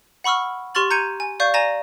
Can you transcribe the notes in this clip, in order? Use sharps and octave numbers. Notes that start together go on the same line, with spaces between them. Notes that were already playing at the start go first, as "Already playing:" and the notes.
F#5 B5 C#6 E6 F6
G4 C6 C#6 F6 A6 F#7
A#5 G6 G#6 C#7 D#7
G#5
D5 F5 C#6 G6
D5 G#5 A#5 A#6 E7